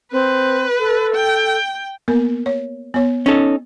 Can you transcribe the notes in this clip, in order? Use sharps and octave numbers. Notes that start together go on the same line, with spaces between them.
C4 B4
A4
G5
A#3 B3 A#4
C#5
B3 C#5
C#4 D#4 A4